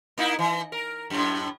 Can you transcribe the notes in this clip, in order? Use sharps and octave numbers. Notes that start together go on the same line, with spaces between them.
A#3 D#4 E4
E3
A#4
F#2 A2